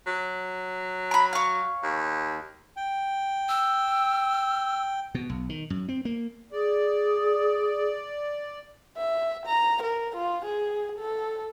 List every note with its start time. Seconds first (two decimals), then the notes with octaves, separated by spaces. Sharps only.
0.07 F#3
1.11 A#5 B5
1.33 C#5 F5
1.83 D#2
2.77 G5
3.49 E6
5.15 B2
5.30 B1
5.49 D#3
5.70 F#2
5.89 C4
6.05 A#3
6.52 G#4 D5
8.97 E5
9.46 A#5
9.83 A#4
10.16 F4
10.46 G#4
10.99 A4